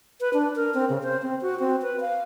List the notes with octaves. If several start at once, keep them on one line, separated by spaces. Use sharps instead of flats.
B4
D4
A#4
C4
C#3
C5
C4
F#4
C4
B4
F5